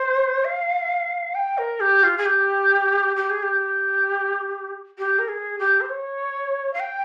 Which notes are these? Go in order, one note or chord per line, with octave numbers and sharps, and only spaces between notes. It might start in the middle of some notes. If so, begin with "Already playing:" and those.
Already playing: C5
F5
G5
A#4
G4
F4
G#4
G4
G4
G#4
G4
G4
A#4
G#4
G4
C5
C#5
F5
G5